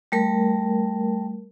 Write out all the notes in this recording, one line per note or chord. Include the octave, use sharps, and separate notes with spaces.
G3 A3 A#4